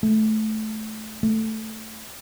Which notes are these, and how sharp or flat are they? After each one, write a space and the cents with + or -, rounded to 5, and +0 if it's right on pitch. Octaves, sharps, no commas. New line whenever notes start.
A3 -15
A3 +5